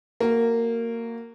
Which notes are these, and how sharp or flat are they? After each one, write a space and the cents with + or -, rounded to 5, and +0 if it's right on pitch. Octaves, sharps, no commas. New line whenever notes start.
A#3 -15 F#4 +0